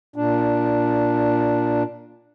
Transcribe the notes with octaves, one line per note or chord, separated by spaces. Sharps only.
A#2 D4